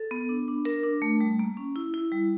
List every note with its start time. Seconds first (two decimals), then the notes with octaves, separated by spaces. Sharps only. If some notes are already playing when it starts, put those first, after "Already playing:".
Already playing: A4
0.11 B3
0.29 D4
0.48 D4
0.65 A#4
0.83 D4
1.02 A3
1.21 G3
1.39 A#3
1.57 C#4
1.76 E4
1.94 E4
2.12 G3